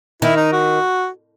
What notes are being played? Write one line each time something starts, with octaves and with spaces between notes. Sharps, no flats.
D#3 E4
D#4
F#4